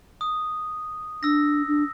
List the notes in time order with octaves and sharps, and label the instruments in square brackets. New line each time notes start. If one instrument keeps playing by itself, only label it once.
[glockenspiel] D#6
[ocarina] D4 [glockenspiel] E6 A#6
[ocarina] D4